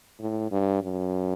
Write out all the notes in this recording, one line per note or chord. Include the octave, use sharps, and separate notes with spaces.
A2
G2
F#2